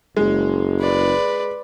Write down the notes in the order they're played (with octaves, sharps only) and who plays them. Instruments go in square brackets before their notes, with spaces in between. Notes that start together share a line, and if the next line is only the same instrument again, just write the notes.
[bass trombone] F#1 [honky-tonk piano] G#3
[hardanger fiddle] B4 D5